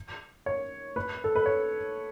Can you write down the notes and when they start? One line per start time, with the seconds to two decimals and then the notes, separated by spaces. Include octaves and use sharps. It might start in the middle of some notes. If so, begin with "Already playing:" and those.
0.46 C#5
0.96 B4
1.24 A4
1.35 B4
1.46 C#5